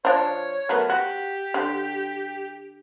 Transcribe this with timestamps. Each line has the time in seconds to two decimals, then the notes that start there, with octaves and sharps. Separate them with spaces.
0.05 F3 D4 C#5
0.69 F#3 A3 B3 A#4
0.90 F#4 G4
1.54 D3